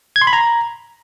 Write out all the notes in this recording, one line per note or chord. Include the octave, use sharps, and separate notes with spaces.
G#6
C6
B5
A#5